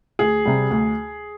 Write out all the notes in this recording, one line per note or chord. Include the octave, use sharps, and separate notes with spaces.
D2 G#4
C3 G3
D2